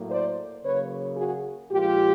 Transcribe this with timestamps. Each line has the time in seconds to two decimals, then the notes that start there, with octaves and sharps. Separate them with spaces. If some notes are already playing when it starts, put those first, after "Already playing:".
Already playing: A2 F#3 A#3
0.10 C5 D5
0.63 C#3 F#3 A#3 B4 C#5
1.16 F#4 G#4
1.70 A#2 F3 G#3 F4 G4